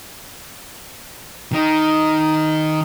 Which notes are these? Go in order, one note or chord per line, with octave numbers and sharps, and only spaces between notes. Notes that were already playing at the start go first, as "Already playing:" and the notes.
D#3 D#4